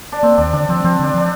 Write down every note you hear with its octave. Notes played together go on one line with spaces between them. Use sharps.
D4
A#3 C4
D#2 D4
D3 D4
F3 C4
F3 C4
D3 D4
F3 D4